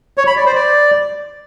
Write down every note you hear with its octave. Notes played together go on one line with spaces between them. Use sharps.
C#5
B5
D5
C5
D5